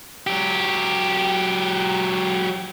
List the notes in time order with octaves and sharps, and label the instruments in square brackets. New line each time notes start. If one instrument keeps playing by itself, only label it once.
[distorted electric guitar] F#3 G4